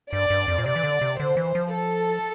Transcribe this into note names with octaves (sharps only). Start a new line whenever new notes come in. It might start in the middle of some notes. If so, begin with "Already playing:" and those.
G2 D5
G2
F2
A#2
C3 D5
E3
D3
C3
D3 C5
E3
F3
A4